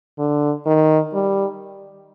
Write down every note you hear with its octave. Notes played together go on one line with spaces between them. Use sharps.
D3
D#3
G3